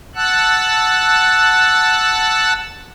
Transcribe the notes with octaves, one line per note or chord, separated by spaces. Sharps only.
F#5 A5 E6 F#6